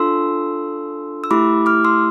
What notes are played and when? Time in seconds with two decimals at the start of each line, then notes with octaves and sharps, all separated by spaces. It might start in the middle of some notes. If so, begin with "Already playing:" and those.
Already playing: D4 F4 A4 C6 E6
1.24 E6
1.31 A3 E4 G4 B5 D6
1.66 D6 F6
1.85 C6 E6